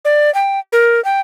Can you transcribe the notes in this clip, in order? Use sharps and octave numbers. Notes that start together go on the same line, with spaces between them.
D5
G5
A#4
G5